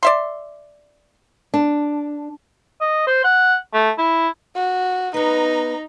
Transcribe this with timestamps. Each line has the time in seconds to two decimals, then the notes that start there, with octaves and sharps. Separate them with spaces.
0.03 D5 E5 C6
1.54 D4
2.81 D#5
3.07 C5
3.24 F#5
3.74 A3
3.98 E4
4.56 F#4
5.14 B3 D#4 B4 A#5